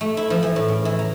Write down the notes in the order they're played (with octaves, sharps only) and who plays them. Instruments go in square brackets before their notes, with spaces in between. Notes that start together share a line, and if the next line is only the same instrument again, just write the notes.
[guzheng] A3
E4
F3
E3
A2
C#3
E3
A#5